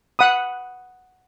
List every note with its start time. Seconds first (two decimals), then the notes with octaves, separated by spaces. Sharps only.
0.19 F#5 B5 D#6